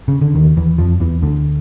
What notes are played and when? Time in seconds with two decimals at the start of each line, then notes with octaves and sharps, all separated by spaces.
0.08 C#3
0.21 D3
0.35 D#2 D#3
0.57 E2 E3
0.78 F2 F3
1.00 E2 E3
1.22 D2 D3